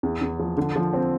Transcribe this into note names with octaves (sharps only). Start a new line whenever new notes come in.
E2
E2
F3
D3
F3
C4